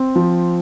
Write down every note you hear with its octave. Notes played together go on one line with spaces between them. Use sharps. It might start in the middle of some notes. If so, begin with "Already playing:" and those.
Already playing: C4
F3